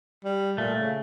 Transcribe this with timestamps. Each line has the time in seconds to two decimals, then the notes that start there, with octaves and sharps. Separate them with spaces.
0.24 G3
0.58 A#2 A3
0.80 C#3